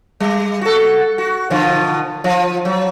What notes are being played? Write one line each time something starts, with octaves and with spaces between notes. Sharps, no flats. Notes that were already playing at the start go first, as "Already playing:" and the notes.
G3
F#4 A4
F#4
B2 D3 F3
F3
F#3